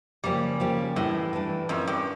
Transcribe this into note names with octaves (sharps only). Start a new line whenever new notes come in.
C#3 F3 G3 A#3 C#4 G4
C#3 F3 A#3 C#4 G4
A2 E3 G3 D4
E3 G3 D4
F2 C#4 F4 A#4 E5
G2